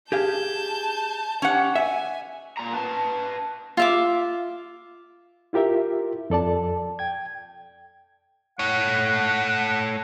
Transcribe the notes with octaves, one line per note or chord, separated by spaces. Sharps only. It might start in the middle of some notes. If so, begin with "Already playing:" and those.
G4 G#4 F5 A5 G6
C#4 G4 F#5
E5 G#5
A#2 A#5
B4 A5
F4 E5 D6
E4 F4 G4 A#4 E5
F2 A4 D5 A5
G5 G#6
A3 C#5 F#5